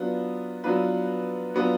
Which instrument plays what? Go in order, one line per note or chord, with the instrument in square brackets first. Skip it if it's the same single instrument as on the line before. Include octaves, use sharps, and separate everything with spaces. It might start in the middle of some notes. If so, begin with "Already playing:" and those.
Already playing: [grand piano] F#3 B3 D4 F4 B4
F#3 B3 D4 F4 B4
F#3 B3 D4 F4 B4